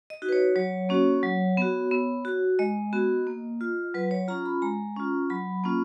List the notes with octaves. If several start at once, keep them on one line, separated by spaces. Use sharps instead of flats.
D#5
D#4 F#4
B4
C#5
F#3 C#5
A#3 C#4 F#4
F#3
B3 F#4
B3
F#4
G#3 D#5
B3 F#4
A#3
F4
F#3 B4
C#5
C#4 F4 A#5
B5
G#3 A#5
C#4 F4
F#3 B5
A#3 C#4 F4